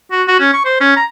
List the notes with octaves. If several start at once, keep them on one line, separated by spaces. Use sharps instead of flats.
F#4
F#4
C#4
C#6
C5
C#4
A#5